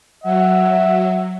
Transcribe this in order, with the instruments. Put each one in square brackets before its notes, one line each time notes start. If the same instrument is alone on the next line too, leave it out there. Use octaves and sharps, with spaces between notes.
[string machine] F#3 [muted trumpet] E5 [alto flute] F#5